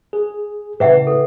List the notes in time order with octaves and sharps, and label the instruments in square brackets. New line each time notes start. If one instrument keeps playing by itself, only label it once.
[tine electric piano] G#4
[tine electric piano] A2 C#3 [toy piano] B4 E5 F#5
[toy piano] A4